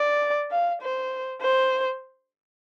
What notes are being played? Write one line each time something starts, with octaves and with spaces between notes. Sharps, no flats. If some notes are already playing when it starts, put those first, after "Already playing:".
Already playing: D5
F5
C5
C5